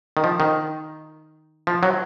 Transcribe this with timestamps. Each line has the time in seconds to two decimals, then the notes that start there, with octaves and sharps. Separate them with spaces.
0.17 D#3
0.24 F3
0.40 D#3
1.67 F3
1.83 F#3